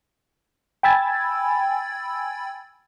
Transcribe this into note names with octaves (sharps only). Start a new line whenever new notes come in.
G5 G#5 B5 E6 G#6 A6